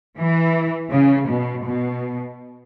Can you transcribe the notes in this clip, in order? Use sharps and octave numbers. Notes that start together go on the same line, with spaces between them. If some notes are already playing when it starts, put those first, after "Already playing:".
E3
C#3
B2
B2